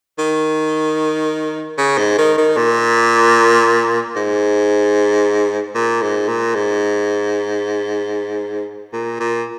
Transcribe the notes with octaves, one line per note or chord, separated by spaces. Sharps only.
D#3
C#3
G#2
D#3
D#3
A#2
G#2
A#2
G#2
A#2
G#2
A#2
A#2